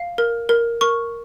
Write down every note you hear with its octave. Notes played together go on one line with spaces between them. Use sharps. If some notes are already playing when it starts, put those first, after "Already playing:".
Already playing: F5
A#4
A#4
A#4 C#6